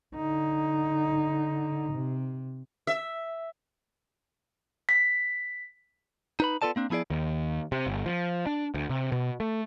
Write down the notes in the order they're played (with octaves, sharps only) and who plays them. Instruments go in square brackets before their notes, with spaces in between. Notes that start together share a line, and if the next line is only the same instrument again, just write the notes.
[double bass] D3 D#4
C3
[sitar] E5
[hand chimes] B6
[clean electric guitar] D#4 B4 B5
B3 F4 A4 D5 A5
A#3 C4 D4
F3 B3 E4 G#4 D5
[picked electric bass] D#2
C3
G1
F3
D4
D2
C3
B2
A3